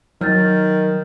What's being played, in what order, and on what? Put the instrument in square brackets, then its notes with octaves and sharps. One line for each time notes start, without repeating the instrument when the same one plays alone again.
[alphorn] D#3 [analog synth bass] F#3 [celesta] F6 G6 A6